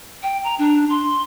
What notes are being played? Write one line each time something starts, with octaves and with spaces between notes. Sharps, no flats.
G5
A#5
D4
C6